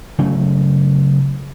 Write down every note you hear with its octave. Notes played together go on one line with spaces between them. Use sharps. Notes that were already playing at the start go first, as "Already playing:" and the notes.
C#3 F#3 A3